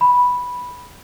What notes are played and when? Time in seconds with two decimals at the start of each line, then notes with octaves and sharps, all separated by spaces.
0.01 B5